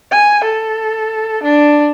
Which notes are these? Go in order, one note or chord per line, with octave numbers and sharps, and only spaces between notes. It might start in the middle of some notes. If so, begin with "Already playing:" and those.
G#5
A4
D4